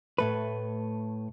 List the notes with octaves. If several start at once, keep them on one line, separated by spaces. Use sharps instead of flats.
A2 A3 B4